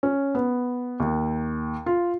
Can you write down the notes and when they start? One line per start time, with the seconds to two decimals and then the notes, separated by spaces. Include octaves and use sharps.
0.03 C#4
0.35 B3
1.00 D#2
1.86 F4